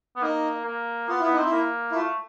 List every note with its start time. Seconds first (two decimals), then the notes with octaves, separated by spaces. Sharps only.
0.16 B3
0.22 A#3 D#4
0.66 A#3
1.09 B3 F4
1.20 B3 E4
1.32 D#4
1.38 C4
1.45 E4
1.52 A#3
1.92 E4
1.95 A3 F4